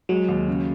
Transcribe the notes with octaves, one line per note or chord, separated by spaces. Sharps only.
F#3 G#3
D#2
C#3